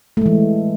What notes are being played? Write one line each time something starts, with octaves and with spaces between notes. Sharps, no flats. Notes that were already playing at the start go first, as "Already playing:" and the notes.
E3 G#3 A3